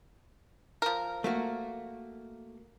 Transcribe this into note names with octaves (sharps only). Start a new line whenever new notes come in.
F3 A#4
A3 A#3 F#4